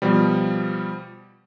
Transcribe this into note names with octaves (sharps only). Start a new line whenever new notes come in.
B2 F3 G3